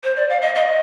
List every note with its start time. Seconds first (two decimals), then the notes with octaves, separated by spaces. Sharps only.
0.04 C5
0.16 D5
0.29 F5
0.42 D#5
0.55 D#5